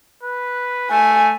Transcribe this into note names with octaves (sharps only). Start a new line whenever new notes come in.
B4
A3 G#5